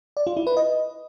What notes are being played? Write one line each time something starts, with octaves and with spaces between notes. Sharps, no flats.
D5
F4
E4
B4
D#5